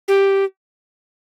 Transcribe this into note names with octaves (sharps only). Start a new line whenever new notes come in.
G4